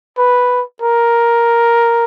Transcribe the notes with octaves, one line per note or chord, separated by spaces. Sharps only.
B4
A#4